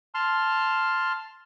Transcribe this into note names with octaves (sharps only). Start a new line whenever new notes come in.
A5 C6 F6